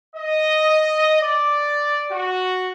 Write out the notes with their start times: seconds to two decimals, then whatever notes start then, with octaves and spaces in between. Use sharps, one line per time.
0.16 D#5
1.21 D5
2.11 F#4